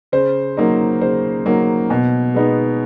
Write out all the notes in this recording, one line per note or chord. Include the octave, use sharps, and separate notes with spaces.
C#3 C5
F#3 A#3 D#4
C#3 C5
F#3 A#3 D#4
B2
G#3 B3 D#4